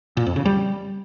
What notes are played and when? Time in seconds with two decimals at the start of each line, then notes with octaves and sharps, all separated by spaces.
0.17 A#2
0.26 F2
0.36 C#3
0.45 G3